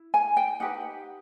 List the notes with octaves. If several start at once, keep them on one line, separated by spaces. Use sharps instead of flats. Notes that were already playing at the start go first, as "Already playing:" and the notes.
Already playing: E4
G#5
G5
D#4 G4 B4 F#5